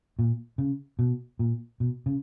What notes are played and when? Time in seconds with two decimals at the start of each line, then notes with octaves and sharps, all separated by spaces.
0.19 A#2
0.58 C#3
0.99 B2
1.39 A#2
1.80 B2
2.06 C#3